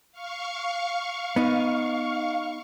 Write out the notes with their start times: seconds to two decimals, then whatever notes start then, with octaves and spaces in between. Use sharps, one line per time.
0.12 F5 C#6
1.36 B3 D#4